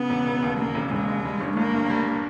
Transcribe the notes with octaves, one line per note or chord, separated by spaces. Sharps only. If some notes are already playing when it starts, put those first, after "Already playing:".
Already playing: C#3 B3
E1
E1
D#2
C#3 A#3
E1
E1 G#3
D#2
G3
G1
G1 A#3
G2
G3